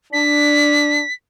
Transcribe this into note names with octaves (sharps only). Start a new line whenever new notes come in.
D4 B6